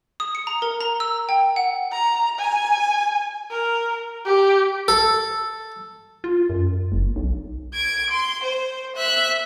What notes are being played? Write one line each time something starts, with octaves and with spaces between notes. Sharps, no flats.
D#6
C#7
A#5
A#4
A#5
E6
G5
F#5
A#5
G#5
A#4
G4
A4
F4
F#2
F#1
B1
G#6 D7
C6
C5
E5 F#6